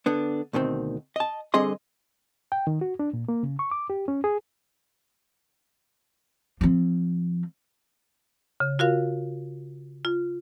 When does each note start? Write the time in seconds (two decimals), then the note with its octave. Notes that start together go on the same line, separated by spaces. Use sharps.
0.06 D3 B3 D4
0.53 D2 B2 D#3 C4
1.16 D#5 A5
1.54 D3 G3 C4 G#4 D#5 C6
2.52 G5
2.67 D#3
2.81 F#4
2.99 D4
3.13 A#2
3.28 A#3
3.43 C#3
3.59 C#6
3.71 D6
3.90 G4
4.08 C#4
4.24 G#4
6.61 F3 C4
8.60 C#3
8.79 F4 F#4 A#4 F5
10.05 F4